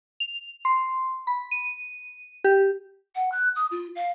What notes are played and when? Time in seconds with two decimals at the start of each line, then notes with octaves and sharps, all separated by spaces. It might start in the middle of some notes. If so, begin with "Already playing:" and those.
0.20 F7
0.65 C6
1.27 B5
1.51 D#7
2.44 G4
3.15 F#5
3.32 F#6
3.56 D#6
3.71 F4
3.95 F5